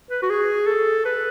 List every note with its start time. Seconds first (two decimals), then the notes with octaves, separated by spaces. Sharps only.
0.11 B4
0.22 F#4
0.30 G#4
0.67 A4
1.05 B4